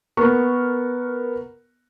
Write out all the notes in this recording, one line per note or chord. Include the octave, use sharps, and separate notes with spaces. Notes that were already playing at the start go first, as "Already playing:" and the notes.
B3 A#4 C#6